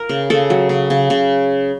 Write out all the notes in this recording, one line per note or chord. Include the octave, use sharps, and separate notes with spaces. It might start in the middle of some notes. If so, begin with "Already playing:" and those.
Already playing: A#4
C#3
C#3 A4
F#3
C#3
C#3
C#3